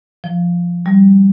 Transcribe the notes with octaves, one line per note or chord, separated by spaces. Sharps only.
F3
G3